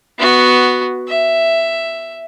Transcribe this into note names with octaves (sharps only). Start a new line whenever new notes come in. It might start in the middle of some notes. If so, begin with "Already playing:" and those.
B3 F#4
E5